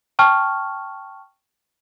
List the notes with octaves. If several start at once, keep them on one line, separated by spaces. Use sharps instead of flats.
G5 A5 C#6 F6